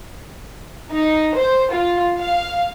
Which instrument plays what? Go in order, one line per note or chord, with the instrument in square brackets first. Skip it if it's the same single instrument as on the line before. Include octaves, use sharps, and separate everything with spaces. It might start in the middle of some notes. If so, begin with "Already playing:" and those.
[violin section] D#4
C5
F4
F5